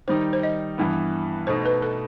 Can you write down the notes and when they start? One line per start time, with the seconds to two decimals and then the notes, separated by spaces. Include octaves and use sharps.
0.08 D#3 G3 D#4 C5
0.33 C5
0.43 D#5
0.78 G2 E3 B3
1.47 B2 A3 D#4 C5
1.66 B4
1.82 A4